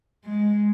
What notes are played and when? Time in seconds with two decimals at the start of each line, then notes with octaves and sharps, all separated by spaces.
0.25 G#3